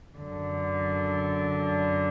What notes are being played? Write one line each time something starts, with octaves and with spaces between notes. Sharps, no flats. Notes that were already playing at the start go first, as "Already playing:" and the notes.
F#2 D3